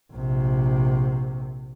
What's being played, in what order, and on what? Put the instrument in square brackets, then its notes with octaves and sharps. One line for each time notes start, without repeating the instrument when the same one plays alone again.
[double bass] A#1 C3